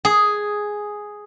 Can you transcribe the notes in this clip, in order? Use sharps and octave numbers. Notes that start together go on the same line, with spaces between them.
G#4